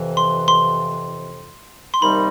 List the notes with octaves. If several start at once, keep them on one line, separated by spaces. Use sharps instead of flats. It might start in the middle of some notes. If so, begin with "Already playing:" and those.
Already playing: F2 C3 E3
C6
C6
C6
C3 D#3 G3 A#3 D#4 B5